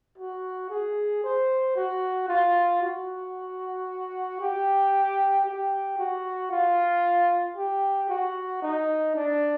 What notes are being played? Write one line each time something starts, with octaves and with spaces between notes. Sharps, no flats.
F#4
G#4
C5
F#4
F4
F#4
G4
G4
F#4
F4
G4
F#4
D#4
D4